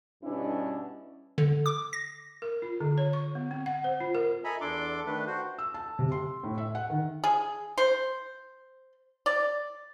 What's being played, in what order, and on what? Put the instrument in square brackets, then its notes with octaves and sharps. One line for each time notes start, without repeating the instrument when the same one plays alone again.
[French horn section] G2 B2 G3 C#4 D4 E4
[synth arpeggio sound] D3
D6
A#6
[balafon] A#4
F4
D3
C#5
C#6
B3
C4
F#5
C5
F4
A#4
[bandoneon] A4 D#5 E5 G#5 A#5 B5
E2 D4 A4 C6 D6
D#3 A3 D4 B4
F#4 C5
[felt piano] E6
A5
C3
C6
A2
E5
F#5
D#3
[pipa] G#4
C5
D5